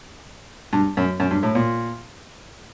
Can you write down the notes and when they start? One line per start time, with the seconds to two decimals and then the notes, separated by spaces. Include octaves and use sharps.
0.73 G2
0.97 F#2
1.20 F#2
1.31 G2
1.43 A2
1.55 A#2